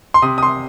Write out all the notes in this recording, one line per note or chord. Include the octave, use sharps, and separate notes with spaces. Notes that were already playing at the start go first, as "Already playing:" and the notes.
C6
C3 D#6
D#6
C6